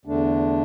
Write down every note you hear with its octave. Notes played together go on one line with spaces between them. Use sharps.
E2 D3 A3 D4